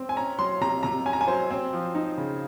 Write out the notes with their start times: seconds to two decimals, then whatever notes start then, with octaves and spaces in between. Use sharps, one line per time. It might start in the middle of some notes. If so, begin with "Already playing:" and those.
Already playing: C4
0.09 G#5
0.16 C#4 A#5
0.39 F#3 C6
0.61 C3 A#5
0.83 C3 A#5
1.06 C#4 G#5
1.13 A#5
1.21 G#5
1.28 F#3 C5
1.51 C4
1.73 F3
1.95 D#4
2.18 C#3